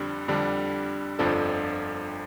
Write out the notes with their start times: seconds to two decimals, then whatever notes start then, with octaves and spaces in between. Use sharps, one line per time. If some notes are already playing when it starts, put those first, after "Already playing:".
Already playing: F2 D3 G3 D4
0.28 F2 D3 G3 D4
1.19 G1 F2 F3 D4 A4